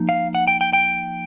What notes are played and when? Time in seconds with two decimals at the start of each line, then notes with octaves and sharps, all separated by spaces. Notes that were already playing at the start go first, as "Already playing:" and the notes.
Already playing: F3 A#3 D#4
0.09 F5
0.35 F#5
0.47 G5
0.61 G5
0.73 G5